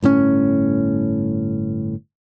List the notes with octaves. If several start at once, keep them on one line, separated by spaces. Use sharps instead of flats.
G1 A2 C3 C#4